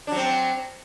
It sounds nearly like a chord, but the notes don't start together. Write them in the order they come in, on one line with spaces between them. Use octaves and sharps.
D4 F#3 C4